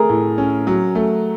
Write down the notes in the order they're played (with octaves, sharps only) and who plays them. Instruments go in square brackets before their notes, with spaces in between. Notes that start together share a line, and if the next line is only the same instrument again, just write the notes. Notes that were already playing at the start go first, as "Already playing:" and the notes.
Already playing: [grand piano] A3 [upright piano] G#4 A#4
[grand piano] A2
C#4
F#3
A3